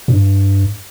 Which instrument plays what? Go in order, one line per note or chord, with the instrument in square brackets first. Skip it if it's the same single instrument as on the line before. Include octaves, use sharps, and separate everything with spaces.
[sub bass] G2